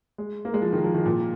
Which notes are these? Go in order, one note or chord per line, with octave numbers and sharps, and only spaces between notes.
G#3
A#3
G#3
F3
D#3
F3
D#3
A#2